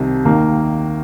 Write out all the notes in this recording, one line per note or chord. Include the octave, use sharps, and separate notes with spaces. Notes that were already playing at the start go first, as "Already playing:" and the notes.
Already playing: C2 C3 D#3
D#2 D#3 A#3